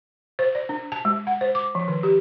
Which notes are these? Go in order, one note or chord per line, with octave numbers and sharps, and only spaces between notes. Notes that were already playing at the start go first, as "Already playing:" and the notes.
C5
D5
D4
A5
G#3
F#5
C5
D6
F3
D#3
G4